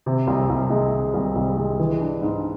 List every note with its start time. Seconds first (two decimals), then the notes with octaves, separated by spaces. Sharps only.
0.06 C3
0.27 C2
0.49 C2
0.70 G#3
0.92 C3
1.14 C2
1.36 C2
1.57 G#3
1.79 E3
2.01 D4
2.22 G#2